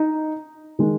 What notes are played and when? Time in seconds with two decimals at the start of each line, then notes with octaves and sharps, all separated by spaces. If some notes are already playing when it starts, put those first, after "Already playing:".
Already playing: D#4 D#5
0.79 D#3 G#3